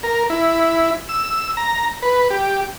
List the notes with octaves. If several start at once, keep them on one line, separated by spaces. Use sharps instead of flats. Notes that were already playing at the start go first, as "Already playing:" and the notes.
A#4
E4
E6
A#5
B4
G4